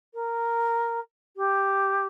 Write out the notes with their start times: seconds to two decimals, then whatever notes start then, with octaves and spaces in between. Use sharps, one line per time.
0.14 A#4
1.36 G4